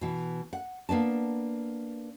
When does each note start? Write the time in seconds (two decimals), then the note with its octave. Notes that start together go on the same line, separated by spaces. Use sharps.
0.01 B2 E3
0.53 F#5
0.89 A#3 B3 D4 A5